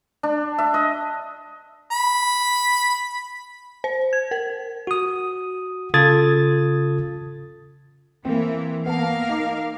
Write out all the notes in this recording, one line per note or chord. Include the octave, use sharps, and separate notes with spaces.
D4
E5
D#5
B5
C5
G#6
A#4
F#4 D#6
C#3 F4 A4 D#6 G#6 A6
E3 A#3 C4
A#3 B3 A#4 F5 A5
D#4 D6